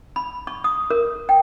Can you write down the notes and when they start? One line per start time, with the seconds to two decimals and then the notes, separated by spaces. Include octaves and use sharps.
0.16 B5
0.47 C#6
0.64 D#6
0.90 A#4
1.29 G5